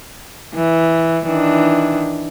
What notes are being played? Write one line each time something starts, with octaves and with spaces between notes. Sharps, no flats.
E3
D#3 E3 D4